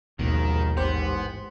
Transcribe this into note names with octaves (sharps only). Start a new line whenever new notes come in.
A#1 D#2 G#2 B2 D#3
A1 G#2 B3 G4 C5